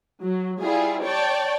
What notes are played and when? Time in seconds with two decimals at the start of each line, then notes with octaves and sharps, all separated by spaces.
0.23 F#3
0.61 G3 E4 F4 G#4
1.03 C#5 D5 G5 A5